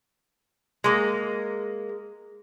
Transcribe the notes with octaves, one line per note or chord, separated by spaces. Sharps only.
G#3 A#3